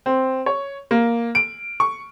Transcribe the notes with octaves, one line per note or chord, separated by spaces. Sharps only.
C4
C#5
A#3
D7
C#6